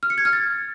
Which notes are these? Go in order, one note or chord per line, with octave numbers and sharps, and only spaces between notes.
F6
C#7
G#6
F6
A6